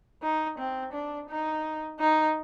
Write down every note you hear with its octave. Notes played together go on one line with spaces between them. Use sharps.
D#4
C4
D4
D#4
D#4